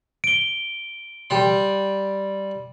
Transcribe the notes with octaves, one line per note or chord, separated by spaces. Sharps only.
D7 G7
G3 C6